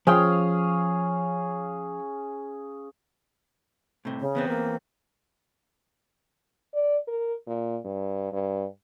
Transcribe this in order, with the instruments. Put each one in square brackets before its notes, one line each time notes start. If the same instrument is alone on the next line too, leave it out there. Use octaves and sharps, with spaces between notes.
[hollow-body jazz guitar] F3 G5 [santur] C#4 G#4 F5
[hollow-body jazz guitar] A2 C3
[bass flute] C#3
[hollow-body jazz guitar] E2 B3 C4
[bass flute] A#3
[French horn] D5
A#4
A#2
G2
G2